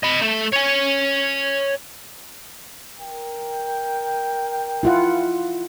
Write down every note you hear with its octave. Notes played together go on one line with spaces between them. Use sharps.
D#5 B5
A3 A4
C#5 G#5
A#4 G5
E4 F4 F#5